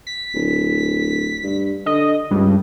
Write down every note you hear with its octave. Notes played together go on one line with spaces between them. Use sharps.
B6
D1
G2
D3 D#5
C#2 G2